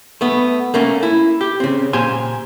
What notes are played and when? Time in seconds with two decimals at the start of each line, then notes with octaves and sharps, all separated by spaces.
0.21 A3 B3
0.74 A3 A#3 C#4
1.03 E4
1.41 G4
1.60 C#3 C4
1.93 A#2 G4 C5 G#5 C6